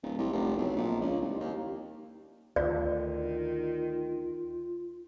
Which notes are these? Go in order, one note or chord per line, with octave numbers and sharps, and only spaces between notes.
D1
C2
F1
B1
A#1
C#2
C2
D#2
D2 D#3 F4 D5